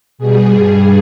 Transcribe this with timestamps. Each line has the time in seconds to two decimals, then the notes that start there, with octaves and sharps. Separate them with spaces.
0.18 B2 G3 G#4
0.51 G2 G3